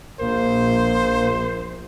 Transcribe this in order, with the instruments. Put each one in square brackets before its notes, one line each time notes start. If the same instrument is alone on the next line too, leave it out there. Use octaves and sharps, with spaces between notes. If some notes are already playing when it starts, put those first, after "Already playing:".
[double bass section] A#1 [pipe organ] A#3 [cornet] C5